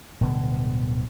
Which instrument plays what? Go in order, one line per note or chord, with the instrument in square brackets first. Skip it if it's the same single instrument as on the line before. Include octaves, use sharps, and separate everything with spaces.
[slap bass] D1 B2 D3 G3